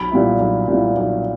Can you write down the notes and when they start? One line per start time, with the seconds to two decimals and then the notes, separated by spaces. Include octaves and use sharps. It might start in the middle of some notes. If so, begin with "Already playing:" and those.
Already playing: B1 B5
0.11 A#2 G3 B3 E4
0.39 B1
0.68 A#2 G3 B3 E4
0.96 B1